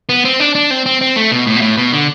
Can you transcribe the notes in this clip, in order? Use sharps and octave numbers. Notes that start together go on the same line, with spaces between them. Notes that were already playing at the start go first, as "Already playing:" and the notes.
B3
C4
D4
D4
C4
C4
C4
A3
B2
A2
B2
A2
B2
D3